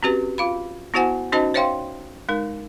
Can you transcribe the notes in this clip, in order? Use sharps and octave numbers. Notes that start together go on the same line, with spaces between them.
C4 C#4 F#4 G4 B4
F4 F5 B5
B3 E4 F#4 C5 F#5 G#5
C#4 D#4 F#4 C5 D#5 A5
C5 C#5 E5 F5 G5 C6
G#3 D#4 A#4